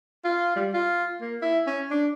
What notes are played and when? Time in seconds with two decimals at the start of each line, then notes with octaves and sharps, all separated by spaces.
0.25 F4
0.56 G3
0.74 F4
1.21 A#3
1.42 E4
1.67 C#4
1.91 D4